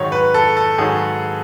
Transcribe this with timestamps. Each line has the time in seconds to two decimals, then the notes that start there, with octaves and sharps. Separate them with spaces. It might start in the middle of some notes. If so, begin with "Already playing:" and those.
Already playing: G#2 D#3 F#3 C#5
0.12 B4
0.34 A4
0.57 A4
0.78 G#2 D#3 F#3 G#4